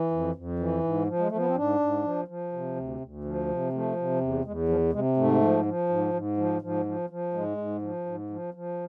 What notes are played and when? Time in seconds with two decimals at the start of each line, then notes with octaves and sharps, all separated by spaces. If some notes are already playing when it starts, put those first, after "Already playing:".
Already playing: E3
0.11 F2
0.35 F2
0.59 E3
0.84 G#2
1.08 F3
1.19 G#3
1.28 F3 A3
1.37 B3
1.46 C4
1.55 G#2 D4
1.80 G#2
2.04 F3
2.28 F3
2.52 C3
2.76 D2
3.00 D2
3.24 F3
3.48 C3
3.72 F3 A3
3.96 C3
4.21 E2
4.45 E2 G#3
4.69 F3
4.93 C3 G#3
5.17 G#2 A3
5.41 F3
5.65 F3
5.89 G#2
6.14 G#2
6.37 F3
6.62 G#2 F3
6.85 F3
7.10 F3
7.34 G#2 G#3
7.57 G#2
7.82 F3
8.06 G#2
8.30 F3
8.54 F3